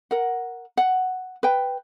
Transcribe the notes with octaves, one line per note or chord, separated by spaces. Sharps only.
A#4 F#5
F#5
B4 G5